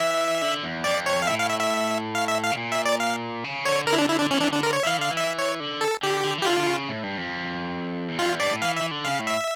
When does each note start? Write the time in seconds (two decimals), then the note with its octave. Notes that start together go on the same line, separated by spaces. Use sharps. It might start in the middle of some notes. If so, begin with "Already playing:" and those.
Already playing: E3 E5
0.42 D3
0.63 E2
0.84 F2 D5
1.06 C#5
1.22 F5
1.27 A2 E5
1.39 F5
1.50 E5
1.60 E5
2.15 F5
2.28 E5
2.44 F5
2.52 C#3
2.57 A#2
2.72 E5
2.86 D5
3.00 F5
3.44 C#3
3.65 D3 C#5
3.87 D3 A#4
3.93 E4
3.98 D4
4.08 D3 E4
4.19 D3 D4
4.30 E3 C#4
4.41 D4
4.52 D3 D4
4.63 A#4
4.73 C#5
4.83 E5
4.86 E3 F5
4.98 D3 F5
5.11 E3
5.17 E5
5.38 C#5
5.60 D3
5.81 A4
6.03 D3 G4
6.24 D3
6.38 E3
6.42 G4
6.46 D3 F4
6.57 D3
6.67 C#3
6.89 A2
7.03 G2
7.18 F2
8.08 E2
8.18 F2 F4
8.30 E2
8.40 G2 D5
8.51 A2
8.62 E3 F5
8.76 E5
8.81 E3
8.91 D3
9.05 C#3 F5
9.19 A2
9.27 E5